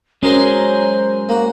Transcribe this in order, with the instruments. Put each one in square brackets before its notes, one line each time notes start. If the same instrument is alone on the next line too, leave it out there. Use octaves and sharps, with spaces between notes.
[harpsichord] F#3 A#4 C6 [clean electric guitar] G#3 D#5 [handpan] C#4 [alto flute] C5
[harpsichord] A#3 F#4